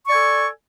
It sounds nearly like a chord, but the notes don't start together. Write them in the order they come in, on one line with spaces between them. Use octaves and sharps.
C#6 D5 G#5 A4